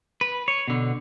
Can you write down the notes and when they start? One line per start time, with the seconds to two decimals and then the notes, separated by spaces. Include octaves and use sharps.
0.21 B4
0.48 C#5
0.68 B2 D3